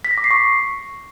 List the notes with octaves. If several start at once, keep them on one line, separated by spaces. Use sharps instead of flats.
B6
A#6
D6
C7
C#6